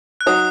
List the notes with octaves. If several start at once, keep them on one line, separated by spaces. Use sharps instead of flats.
F#6
F#3 D#4 F#4 C#5 D#6